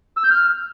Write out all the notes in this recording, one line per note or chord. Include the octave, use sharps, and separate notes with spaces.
E6
G6
F6